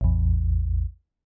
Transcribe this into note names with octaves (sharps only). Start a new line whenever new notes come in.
A1 E2